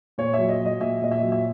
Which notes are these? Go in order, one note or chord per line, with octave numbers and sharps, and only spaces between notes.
A#2 C#5
E5
F#3
D#5
F#3
D#5
A#2 E5
A#2 D#5
E5
F#3
E5